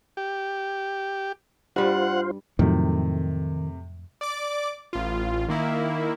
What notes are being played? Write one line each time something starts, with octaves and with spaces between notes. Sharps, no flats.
G4
G2 G3 F4 C5 F#5
F2 A2 C3 D#3 F#3 A3
D5 D6
A1 F4
D#3 A#3 E4